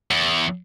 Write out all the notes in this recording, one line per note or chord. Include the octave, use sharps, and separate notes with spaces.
E2